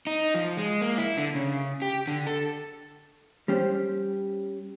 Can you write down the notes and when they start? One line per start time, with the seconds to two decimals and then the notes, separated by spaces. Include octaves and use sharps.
0.07 D#4
0.34 F3
0.57 G#3
0.81 A#3
0.98 E4
1.17 D3
1.35 C#3
1.82 G4
2.07 D3
2.27 A4
3.48 G3 C#4 G4 C5